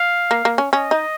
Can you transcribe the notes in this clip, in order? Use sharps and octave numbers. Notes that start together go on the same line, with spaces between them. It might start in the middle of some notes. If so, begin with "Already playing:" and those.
Already playing: F5
A#3
A#3
C#4
C#4 D#5
D#4